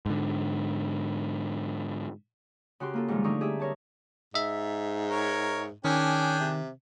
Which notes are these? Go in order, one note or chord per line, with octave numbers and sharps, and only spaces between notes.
G#2 D3
C#3 F#4 G4 C6
A#3 F4 A4
G#2 C3 D#3 F3 G3 G#3
D3 A3 C4 D#4 C#6
G4 G#4 E5
A#4 C#5 A5
G#2 D#5 E5
A#4 C#5
D#3 C#4 D4 G#4 G5
C3